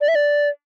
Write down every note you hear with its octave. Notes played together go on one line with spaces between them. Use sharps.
D5
E5
D5